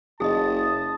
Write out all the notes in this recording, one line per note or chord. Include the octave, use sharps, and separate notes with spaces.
F#1 G#4 D#5 A5 D#6